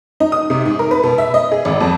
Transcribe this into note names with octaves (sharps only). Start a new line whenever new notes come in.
D#4
D#6
C3
G#2
A#4
B4
B2
E5
D#5
G#4
G#1
F2